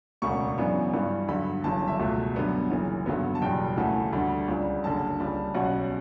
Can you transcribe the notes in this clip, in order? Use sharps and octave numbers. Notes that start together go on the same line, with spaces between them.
E1 D2 C#3 C#6
F#2 C#3 E3 B3 D4
G2 E3 G3 D4
G2 D3 F#3 B5
G1 F#2 C#3 E3 A5
E5
C#2 B2 A3
F#2 D3 G3 B3 D4
F#1 F#2 E3
G2 D3 F#3 B3
A5
F#1 E2 B2 G3 G5
D2 C#3 E3 A3 A5
D2 D3 G3 D4 B5
C#2 C#3 G3 D4
F#1 F#2 D3 A5
C#2 C#3 G3
B1 B2 G3 C#4 F#5